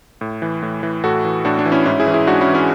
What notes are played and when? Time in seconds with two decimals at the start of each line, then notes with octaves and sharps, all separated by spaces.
0.21 A2
0.42 E3
0.62 A2
0.83 E3
1.04 A2 F#4 A4
1.25 E3
1.45 A2 D4 F#4
1.59 D4
1.65 E3
1.72 C#4 E4
1.86 G#2 C#4 E4
2.00 E4 G#4
2.07 E3
2.14 E4 G#4
2.27 G#2 D4 F#4
2.41 C#4 E4
2.48 E3
2.54 C#4 E4